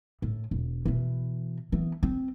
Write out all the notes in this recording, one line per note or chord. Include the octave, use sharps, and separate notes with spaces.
A2
E1
B2 E3
E3 B3
C4